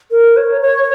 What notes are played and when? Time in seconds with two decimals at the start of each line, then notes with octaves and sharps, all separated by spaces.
0.11 A#4
0.37 C#5
0.62 C#5